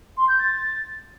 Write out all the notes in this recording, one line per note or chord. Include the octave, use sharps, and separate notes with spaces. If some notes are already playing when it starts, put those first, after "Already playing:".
C6
G6
A6